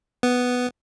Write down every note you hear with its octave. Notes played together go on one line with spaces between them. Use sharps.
B3